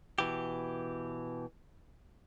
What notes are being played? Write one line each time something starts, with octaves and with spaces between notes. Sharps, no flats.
B2 E3 G4